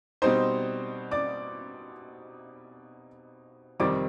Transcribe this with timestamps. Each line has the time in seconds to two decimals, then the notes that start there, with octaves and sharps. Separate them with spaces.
0.22 B2 G3 C4 D#4 C5 C6
1.11 D5 D6
3.80 F2 C3 D#3 G3 C4 D5 D6